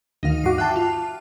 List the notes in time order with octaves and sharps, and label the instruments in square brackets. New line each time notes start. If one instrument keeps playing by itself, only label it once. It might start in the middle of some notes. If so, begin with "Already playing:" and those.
[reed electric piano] D2 D#3 [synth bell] D#4 F5
[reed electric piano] G2 F#4 [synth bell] D6 C7
[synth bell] E5 G5 [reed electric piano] A5 F#6
[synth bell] F4